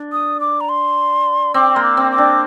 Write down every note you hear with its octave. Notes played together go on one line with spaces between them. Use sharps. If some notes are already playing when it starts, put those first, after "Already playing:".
Already playing: D4
D#6
D6
A#5
C6
C4 D6
A#3 C6
D6
C4
D6
D4